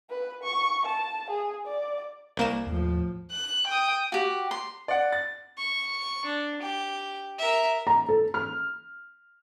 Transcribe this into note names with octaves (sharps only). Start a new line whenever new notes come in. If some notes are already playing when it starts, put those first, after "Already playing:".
B4
C#6
A5
G#4
D5
C2 A#3 E7
D#2 A2 F3
F#6
G5 D#6
F#4 G4
C6
D5 F#5
A6
C#6
D4
G4 G5
A#4 E5
A#5
A4
F6